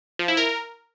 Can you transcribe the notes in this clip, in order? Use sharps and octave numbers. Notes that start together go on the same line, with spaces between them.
F3
E4
A#4